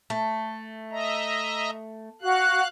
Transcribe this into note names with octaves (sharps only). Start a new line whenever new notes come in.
A3
D#5 E5 A#5
F#4 F5 F#6